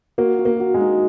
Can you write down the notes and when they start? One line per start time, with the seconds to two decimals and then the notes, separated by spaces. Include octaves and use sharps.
0.18 A#3 F#4
0.39 F#4
0.45 A#3
0.60 F#4
0.74 G#3
0.81 D#4